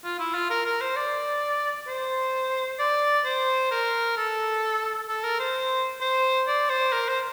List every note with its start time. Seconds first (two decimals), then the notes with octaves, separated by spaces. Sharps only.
0.04 F4
0.19 E4
0.34 F4
0.50 A#4
0.65 A#4
0.81 C5
0.96 D5
1.87 C5
2.79 D5
3.25 C5
3.71 A#4
4.17 A4
5.09 A4
5.24 A#4
5.40 C5
6.01 C5
6.47 D5
6.69 C5
6.92 A#4
7.08 C5